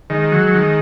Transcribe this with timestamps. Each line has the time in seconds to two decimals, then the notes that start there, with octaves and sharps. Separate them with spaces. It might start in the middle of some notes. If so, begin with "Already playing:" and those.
0.10 D#3 G#3
0.32 F#3
0.54 D#3